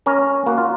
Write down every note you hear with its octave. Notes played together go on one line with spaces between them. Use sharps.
C#4 A#4
A#3 F#4
F4